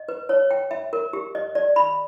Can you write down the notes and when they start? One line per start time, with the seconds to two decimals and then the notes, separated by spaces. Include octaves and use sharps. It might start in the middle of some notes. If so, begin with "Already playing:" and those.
Already playing: D#5
0.09 B4
0.29 C#5
0.51 G5
0.71 E5
0.93 A#4
1.13 G4
1.35 D#5
1.55 D5
1.76 B5